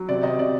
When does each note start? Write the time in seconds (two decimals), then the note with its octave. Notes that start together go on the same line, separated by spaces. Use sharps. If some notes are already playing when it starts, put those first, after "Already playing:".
Already playing: F#3
0.09 C3 D5
0.23 C3 D#5
0.38 C3 D5